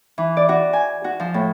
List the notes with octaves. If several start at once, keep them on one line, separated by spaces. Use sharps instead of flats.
E3
D5
F#4
G#5
F#4
F3
A2